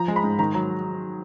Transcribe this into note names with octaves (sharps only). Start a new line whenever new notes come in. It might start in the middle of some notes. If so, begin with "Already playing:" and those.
Already playing: F3 A#5
G#3
B5
G#2
D#3 A#5
F#3 A#5